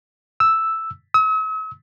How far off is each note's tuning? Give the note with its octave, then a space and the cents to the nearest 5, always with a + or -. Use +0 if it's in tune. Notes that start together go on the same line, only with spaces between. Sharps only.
E6 +0
E6 -45